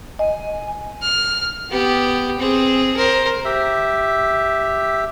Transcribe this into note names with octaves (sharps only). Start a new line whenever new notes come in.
D#5 G#5
F6
B3 G4
C4 G#4
A#4 C5
G4 E5